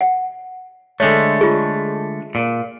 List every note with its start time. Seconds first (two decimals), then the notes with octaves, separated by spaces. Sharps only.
0.01 F#5
1.00 D3 G#3 A3 C#5
1.41 F4 G#4
2.35 A#2